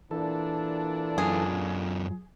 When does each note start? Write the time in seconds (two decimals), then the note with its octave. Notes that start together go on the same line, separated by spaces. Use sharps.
0.11 A#2 E3 D4 A4
1.18 F#2 F4 G#4